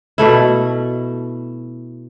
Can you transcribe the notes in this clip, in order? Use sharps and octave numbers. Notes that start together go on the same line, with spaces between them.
B2 A3 E4